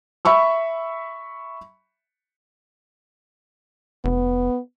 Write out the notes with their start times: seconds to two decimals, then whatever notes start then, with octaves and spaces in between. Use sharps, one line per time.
0.25 E5 B5 C#6 E6
4.05 F1 B3